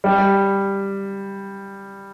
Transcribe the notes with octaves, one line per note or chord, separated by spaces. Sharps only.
G3